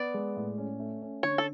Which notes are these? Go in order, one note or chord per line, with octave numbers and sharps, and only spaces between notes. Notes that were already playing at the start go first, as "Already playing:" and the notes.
Already playing: B3 D5
G#3
A2
C#4
A3
C#4
D3 C#5
A4